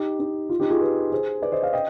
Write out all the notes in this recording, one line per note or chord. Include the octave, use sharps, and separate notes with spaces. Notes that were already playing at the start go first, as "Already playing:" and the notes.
Already playing: D#4 G4
D#4
F4
D#4 G4
F4 G#4
G4 B4
G#4 C5
B4 D5
C5 D#5
D5 F5
D#5 G5